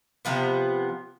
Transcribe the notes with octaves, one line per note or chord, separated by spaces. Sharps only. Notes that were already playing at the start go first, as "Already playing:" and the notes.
C3 F3 B3